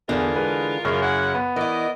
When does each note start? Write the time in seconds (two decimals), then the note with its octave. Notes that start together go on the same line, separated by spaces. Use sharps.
0.09 E2 D3 E3 F4 G#4 A#4
0.36 G#3 B4
0.85 F#2 C#3 C#5
1.03 C#4 E4 F#5
1.35 B3
1.56 E3 E4 A#4 D5 D#5